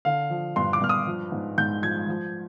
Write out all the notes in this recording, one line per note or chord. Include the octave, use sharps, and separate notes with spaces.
D3 F5
F3
G2 C6
D6
G2 F6
D#6
F3
G#2
G#2 G6
F3 G#6
F3